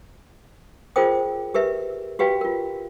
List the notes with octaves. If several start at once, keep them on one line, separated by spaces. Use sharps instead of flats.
F4 G#4 A#4 C5 G5 D#6
G4 A#4 B4 E5
F#4 G4 B4 F5 G5
F4 A#4